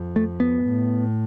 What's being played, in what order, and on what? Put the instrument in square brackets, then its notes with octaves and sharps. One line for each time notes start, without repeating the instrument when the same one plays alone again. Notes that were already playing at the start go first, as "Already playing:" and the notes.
Already playing: [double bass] F2
[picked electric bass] A3
B3
[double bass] A2